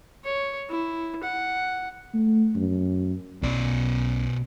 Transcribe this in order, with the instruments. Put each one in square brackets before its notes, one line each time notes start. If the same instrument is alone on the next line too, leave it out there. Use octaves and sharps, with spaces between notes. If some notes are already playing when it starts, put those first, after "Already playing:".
[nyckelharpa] C#5
E4
F#5
[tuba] A3
F#2
[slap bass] B1 B3 C#4 [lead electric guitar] B2 D5